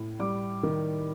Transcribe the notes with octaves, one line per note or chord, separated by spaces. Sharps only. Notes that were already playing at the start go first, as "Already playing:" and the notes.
Already playing: A2
G3 D6
D#3